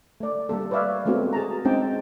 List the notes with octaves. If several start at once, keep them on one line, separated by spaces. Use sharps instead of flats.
A3 D5
G3 A#3 A4
B4 C#5 D5 E5 F5
G#3 A3 B3 C4 F4 F#4
G#4 A5 A#5
G#3 C4 C#4 D#4 G5 A5